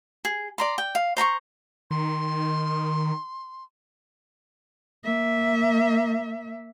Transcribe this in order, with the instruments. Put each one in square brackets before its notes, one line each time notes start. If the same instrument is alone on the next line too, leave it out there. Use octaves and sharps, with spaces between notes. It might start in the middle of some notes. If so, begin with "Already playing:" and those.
[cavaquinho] G#4
D5 A#5 C6
G5
F5
C5 A#5 B5 C#6
[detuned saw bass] D#3 [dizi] C6
[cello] A#3 E5